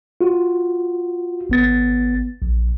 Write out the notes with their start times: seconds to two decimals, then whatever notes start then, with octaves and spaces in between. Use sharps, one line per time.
0.21 F4 F#4
1.50 G#1 B3 A6
2.42 A#1